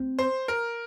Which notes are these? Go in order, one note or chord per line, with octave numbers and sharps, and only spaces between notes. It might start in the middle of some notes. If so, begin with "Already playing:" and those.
Already playing: C4
C5
A#4